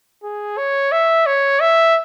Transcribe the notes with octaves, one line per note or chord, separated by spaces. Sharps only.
G#4
C#5
E5
C#5
E5